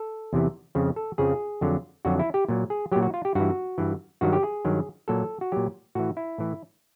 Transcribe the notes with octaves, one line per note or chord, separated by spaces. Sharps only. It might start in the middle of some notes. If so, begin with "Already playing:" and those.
Already playing: A4
E2 C3 E3
F2 C#3 F3
A4
F2 C#3 F3 G#4
F2 D3 F#3
F2 D3 F#3 F#4
E4
G4
A#2 F#3
G#4
A#2 F#3 G4
F#4
F4
G4
G2 E3 F#4
G2 E3
G2 D#3 F#3 F#4
G4
G#4
G2 D#3 F#3
A#2 F#3 A4
F#4
A#2 F#3 G4
A2 E3 F#4
E4
A2 E3